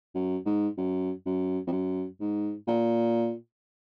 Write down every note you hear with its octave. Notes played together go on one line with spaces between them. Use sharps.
F#2
G#2
F#2
F#2
F2
F#2
G#2
A#2